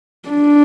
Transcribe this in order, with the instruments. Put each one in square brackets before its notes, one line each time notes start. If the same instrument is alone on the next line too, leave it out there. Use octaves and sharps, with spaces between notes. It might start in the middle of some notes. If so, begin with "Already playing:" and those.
[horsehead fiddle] D4